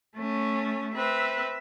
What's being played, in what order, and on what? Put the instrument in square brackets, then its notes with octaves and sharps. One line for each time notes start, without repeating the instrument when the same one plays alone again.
[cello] A3 C#4
[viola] C4 B4 [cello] E5